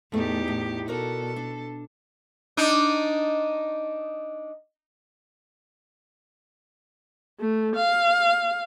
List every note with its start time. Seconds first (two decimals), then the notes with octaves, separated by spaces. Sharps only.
0.12 E2 A2 A3 D#4 G4
0.48 A2
0.88 B2 F#4 A4 A#4 D5
1.36 D4
2.57 D4 D#4
7.40 A3
7.76 F5